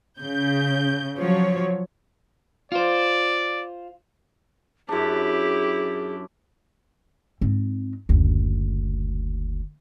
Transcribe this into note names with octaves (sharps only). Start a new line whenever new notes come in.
C#3 G6
F3 F#3 C#5
F4 C5 D5
F#2 D4 E4 G4 G#4
G#2 C4
F#1 D2